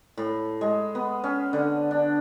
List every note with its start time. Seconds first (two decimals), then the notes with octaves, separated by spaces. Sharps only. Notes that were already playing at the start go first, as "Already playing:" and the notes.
0.17 A2
0.61 G#3
0.95 B3
1.24 C#4
1.53 D3
1.91 D4